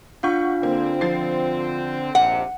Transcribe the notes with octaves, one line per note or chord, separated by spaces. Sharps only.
D4 F4 F5 F#5 C#6
D3 A#3 C4
F3 A6 C7
A#1 D#2 C3 F#5